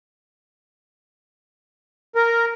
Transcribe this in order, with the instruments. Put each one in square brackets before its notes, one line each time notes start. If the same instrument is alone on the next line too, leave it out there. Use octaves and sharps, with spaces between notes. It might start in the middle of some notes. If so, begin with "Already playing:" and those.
[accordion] A#4